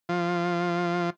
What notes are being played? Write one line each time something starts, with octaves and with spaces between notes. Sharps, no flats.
F3